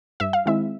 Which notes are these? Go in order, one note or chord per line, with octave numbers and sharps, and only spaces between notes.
G2 E5
F5
D#3 G#3 C4 E4 E5